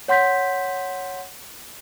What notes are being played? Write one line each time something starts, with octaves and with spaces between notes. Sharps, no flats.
C#5 F#5 C6 G6 B6